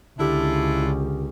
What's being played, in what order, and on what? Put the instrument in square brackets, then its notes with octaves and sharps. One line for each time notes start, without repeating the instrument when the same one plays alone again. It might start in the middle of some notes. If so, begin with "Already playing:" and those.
[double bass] C#2 [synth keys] D3 G4 [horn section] D4 E4 F4